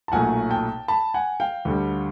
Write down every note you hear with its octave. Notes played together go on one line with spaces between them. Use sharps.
A5
B1 A#2 F#3 A3 F#5 G#5
G5 A5
A5 B5
F#5 G#5
F5 G5
D2 D3 G3